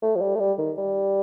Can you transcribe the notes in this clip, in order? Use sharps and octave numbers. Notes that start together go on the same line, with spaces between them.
A3
F3
G3
A3
G3
D#3
G3